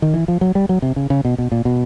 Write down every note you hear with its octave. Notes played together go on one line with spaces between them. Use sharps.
D#3
E3
F3
F#3
G3
F#3
C3
C#3
C#3
B2
B2
A#2
B2